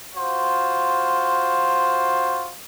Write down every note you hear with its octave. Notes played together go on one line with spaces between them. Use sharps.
F4 F#4 C5